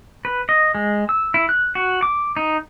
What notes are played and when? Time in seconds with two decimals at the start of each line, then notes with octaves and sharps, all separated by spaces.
0.25 B4
0.49 D#5
0.75 G#3
1.09 E6
1.34 E4
1.49 F#6
1.75 F#4
2.03 D6
2.37 D#4